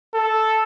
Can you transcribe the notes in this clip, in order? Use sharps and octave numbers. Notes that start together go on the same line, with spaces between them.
A4